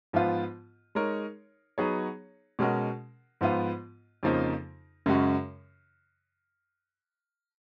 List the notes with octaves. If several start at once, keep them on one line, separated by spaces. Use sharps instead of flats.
G#2 F3 B3 F4
G#3 D#4 A#4 C#5
F#3 B3 D#4 G#4 C#5
B2 G#3 C#4 F#4 A#4
G#2 F3 B3 F4
F2 C#3 F3 A#3 D#4
F#2 C#3 G#3 C#4 F#4